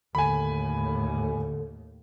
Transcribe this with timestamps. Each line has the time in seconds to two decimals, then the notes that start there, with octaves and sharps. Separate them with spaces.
0.15 D#2 A2 D3 G#5 B5